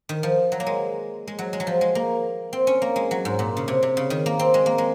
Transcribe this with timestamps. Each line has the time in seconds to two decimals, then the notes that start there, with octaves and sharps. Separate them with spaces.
0.09 D#3
0.23 F3
0.52 F#3
0.60 A#3
0.67 G#3
1.27 G#3
1.39 F#3
1.53 G#3
1.60 F#3
1.67 F3
1.81 G#3
1.95 A#3
2.53 C4
2.67 C#4
2.82 A#3
2.96 G#3
3.11 F#3
3.25 G#2
3.39 A#2
3.57 C#3
3.68 C3
3.83 C3
3.97 C#3
4.10 D#3
4.26 A#3
4.39 C4
4.54 G#3
4.66 A#3
4.78 G#3